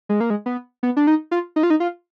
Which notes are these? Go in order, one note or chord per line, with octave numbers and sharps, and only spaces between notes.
G#3
A#3
G#3
B3
B3
D4
D#4
F4
D#4
F4
D#4
F4